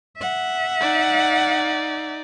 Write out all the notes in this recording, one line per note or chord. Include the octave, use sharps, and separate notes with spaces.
E5 F#5
D#4 D5